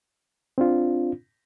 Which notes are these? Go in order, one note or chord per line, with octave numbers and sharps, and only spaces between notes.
C4 D4 F4